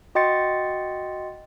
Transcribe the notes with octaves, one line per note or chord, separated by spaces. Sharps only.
F#4 D#5 G5 C6 A6 C#7